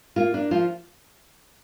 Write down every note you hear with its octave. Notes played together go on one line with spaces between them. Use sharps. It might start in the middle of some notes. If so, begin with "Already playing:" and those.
A#3 F4
A#3 D4
F3 F4